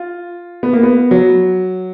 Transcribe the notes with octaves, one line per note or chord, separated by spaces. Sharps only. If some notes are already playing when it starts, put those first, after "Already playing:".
Already playing: F4
B3
A#3
B3
F#3